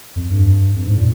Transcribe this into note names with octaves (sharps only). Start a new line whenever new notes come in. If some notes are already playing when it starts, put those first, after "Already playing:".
F2
G2
F2
G#2
A#2